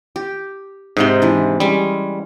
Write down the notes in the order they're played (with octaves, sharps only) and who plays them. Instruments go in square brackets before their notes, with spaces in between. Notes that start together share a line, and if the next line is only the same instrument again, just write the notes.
[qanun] G4
[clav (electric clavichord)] G#2 C3 [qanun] D#4 A#5 C6
[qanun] E3 D4
[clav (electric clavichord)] G3 [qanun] G#3 C#4